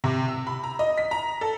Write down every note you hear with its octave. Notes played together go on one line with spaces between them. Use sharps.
C3
E6
B5
A#5
D#5
B6
A#5
A4